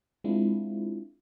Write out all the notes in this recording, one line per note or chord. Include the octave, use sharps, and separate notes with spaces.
G#3 C4 D4 E4 F4